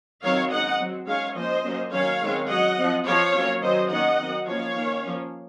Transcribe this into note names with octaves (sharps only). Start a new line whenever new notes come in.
D#3 F#3 C4 C#5 F5
D#3 G#3 C#4 D#5 F#5
F#3 C4
D#3 G#3 C#4 C#5 F5
F3 A#3 C#4 C5 D#5
F#3 A#3 C#4
D#3 F#3 C#4 C#5 F5
D#3 G#3 C4
F#3 C#4 D#5 F#5
F3 C4
F3 C4 C#5 F5
F#3 A#3 C#4
D#3 F#3 C#4 C5 D#5
D#3 A#3 C#4 D#5 F#5
D#3 F#3 C4
F3 A#3 C#4 C#5 F5
D#3 A#3 C#4
F3 A#3 C#4